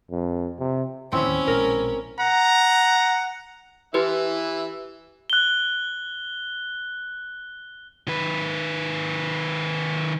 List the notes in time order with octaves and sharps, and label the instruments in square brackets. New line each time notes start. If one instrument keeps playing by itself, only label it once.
[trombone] F2
C3
[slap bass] D1 D#2 F3 [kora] C4 E4 [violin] C#4
[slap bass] A#1 B2 G#3 [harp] A#4
[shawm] F#5 [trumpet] A#5
[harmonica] E3 E5 [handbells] E4 G4 B4
[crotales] F#6 G7
[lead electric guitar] D#3 B4